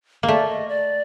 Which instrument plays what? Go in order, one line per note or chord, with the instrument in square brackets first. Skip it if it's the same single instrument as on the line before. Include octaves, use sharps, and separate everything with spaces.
[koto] A#3
[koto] A3 [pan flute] D5
[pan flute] D#5
D5